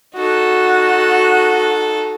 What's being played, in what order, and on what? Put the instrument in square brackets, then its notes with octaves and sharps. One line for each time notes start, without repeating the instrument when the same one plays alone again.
[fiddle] D#4 A4 [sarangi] F#4